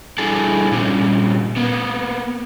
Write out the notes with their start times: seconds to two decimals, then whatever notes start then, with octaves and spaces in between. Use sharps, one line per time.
0.18 G3 D4 E4 G#4 A4 A5
0.71 A#2 G3 C4 C#4
1.57 A#3 B3